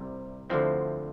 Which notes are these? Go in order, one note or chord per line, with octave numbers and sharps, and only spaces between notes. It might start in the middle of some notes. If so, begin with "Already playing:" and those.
Already playing: C2 C3 G3
D2 D3 F3 C4 E4